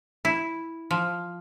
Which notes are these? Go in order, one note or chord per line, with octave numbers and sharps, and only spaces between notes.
E4
F3